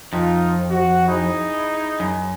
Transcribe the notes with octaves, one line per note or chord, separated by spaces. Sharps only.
F2 D#4 F4
F#4
D#4 E4 G#4
F#2